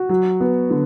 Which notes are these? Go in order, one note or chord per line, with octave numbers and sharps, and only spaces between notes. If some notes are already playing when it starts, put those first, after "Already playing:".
Already playing: F#4
F#3
B3
D3